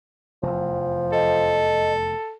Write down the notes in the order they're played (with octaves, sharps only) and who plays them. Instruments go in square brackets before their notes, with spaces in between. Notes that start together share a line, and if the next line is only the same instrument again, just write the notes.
[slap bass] F1 E2 [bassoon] F3
[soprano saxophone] A4 [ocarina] D#5